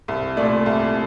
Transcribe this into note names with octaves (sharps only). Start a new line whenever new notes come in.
C2
A#2 A3 D5
C2